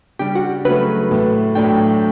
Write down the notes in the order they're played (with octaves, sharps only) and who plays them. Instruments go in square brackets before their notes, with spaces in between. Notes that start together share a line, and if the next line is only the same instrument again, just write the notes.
[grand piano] C#3 G3 D4 [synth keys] G4
[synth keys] F#4
[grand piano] C#3 F#3 A3 [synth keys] B4
[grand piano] A2 E3 A3 E4
[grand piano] A2 F#3 A3 D4 [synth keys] G5